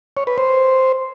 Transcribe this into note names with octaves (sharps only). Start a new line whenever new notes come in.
C#5
B4
C5